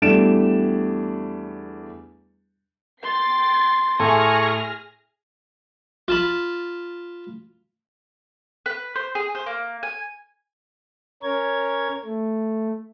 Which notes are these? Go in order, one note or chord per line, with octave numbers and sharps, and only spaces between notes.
E2 G3 A3 D4 D7 E7
G5 C6 A6 C7
A2 G#4 A4 G#5 C#6 F6 A#6
F4 A5 B5
B4
C5
G#4
C5
A#3
G#5
C#4 A#4 C#5 G#6
A3